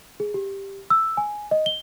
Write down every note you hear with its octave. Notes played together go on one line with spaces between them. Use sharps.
G#4
G4
E6
G#5
D#5
G7